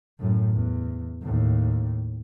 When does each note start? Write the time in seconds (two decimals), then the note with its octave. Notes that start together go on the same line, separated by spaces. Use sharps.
0.18 F#2 A2
0.53 E2
1.21 D#2 A2